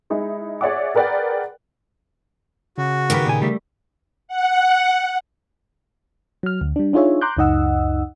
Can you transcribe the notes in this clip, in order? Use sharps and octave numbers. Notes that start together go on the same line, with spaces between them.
G#3 D#4 E4
G#4 C#5 D5 E5 F#5 D6
G#4 A#4 B4 D5 F#5 G5
C#3 F#4
D#3 B3 G4 A#4 B4
A#2 G#5
G3 A3 E5
F#5
F#3 F6
D2
G3 D4
D4 D#4 F4 G#4 C#5 E5
A#5 C6 D6 F#6 G6
C#2 F#2 D#4 D#5 F#5 E6